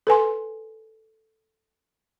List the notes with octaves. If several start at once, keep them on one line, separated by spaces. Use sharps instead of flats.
A4 B4 G#5 C6